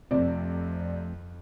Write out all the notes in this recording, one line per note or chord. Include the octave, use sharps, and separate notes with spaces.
F2 C3 F3 A3 C4 D5